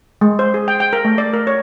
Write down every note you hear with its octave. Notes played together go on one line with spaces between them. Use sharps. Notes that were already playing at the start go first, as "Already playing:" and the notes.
G#3
C5
G#4
G5
G5
A#4
A3
D5
A#4
C#5